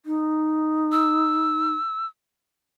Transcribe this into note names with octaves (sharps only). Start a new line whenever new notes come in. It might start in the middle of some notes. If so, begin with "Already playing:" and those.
D#4
E6